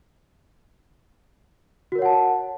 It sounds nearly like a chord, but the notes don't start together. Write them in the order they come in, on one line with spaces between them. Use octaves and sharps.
F#4 A#4 C#5 F#5 A5